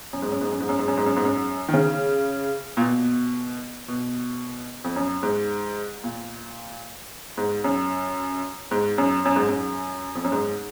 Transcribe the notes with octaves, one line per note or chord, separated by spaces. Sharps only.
F#2
G#2
F#2
G#2
F#2
G#2
F#2
G#2
F#2
G#2
F#2
G#2
F#2
D#3
C#3
A#2
B2
B2
F2
F#2
G#2
A#2
G#2
F#2
G#2
F#2
F#2
G#2
F#2
F2
F#2
G#2